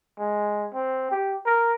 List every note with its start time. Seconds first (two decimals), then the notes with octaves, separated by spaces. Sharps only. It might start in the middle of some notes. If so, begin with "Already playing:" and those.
0.19 G#3
0.74 C4
1.11 G4
1.46 A#4